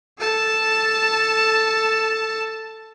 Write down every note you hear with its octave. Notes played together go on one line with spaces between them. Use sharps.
A4 A5